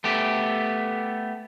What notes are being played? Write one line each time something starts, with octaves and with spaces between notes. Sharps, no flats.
A3 B3 G4